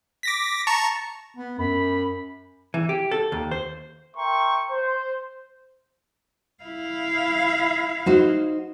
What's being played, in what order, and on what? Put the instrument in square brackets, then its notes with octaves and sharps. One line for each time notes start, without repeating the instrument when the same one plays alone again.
[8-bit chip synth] D6 A#6 B6
A5 A#5 C#6
[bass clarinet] B3
[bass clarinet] F#2 [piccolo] B5
[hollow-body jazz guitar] E3
G4
A4
D#2
C5
[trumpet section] A#4 E5 G5 C6 C#6
C5
[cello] E4 F5
[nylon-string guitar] D#4 F#4 C5